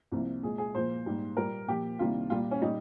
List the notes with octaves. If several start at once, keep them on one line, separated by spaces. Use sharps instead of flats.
C2 C3 F3 A#3
A#2 G#3 G#4
G#4
A#2 F3 A#3 C5
G#2 G3 A#3
A#2 G3 A#3 A#4
A#2 F3 A#3 G4
C2 C3 D#3 G3 A#3 F4
A#2 G3 A#3 F4
C#4
A#2 G3 A#3 D#4